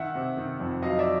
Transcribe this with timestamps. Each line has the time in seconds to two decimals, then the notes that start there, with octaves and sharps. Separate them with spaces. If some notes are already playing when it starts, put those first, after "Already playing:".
Already playing: D#3 E5 F#5
0.15 C3
0.37 D#3
0.60 F2
0.83 F#3 D#5 F5
0.99 D5 E5